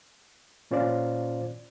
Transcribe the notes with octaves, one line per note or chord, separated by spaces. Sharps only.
A#2 C#4 F4 C5 D5